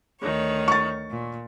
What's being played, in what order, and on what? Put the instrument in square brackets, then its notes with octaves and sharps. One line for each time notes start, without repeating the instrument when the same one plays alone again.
[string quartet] D2 D#3 C#5
[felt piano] C#6 A6
[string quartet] A#2